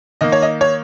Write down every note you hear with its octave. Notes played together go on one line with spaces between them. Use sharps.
D#3 A#3 D#5
C#5
D#5
C#5